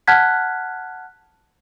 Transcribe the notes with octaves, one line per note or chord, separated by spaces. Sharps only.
F#5 A5 F6 F#6 G#6 B6